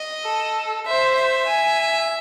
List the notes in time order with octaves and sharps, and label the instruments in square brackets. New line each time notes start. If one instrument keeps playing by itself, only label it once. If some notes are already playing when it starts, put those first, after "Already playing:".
Already playing: [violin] D#5
[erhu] A4
[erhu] C5 [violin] E5
[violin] E5
[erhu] G#5